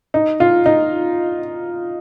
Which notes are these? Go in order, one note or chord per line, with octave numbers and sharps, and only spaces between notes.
D#4
F4
D#4